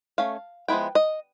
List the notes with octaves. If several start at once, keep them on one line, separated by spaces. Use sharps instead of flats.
A3 C#4 F5
F3 G#3 B3 E4 G5
D#5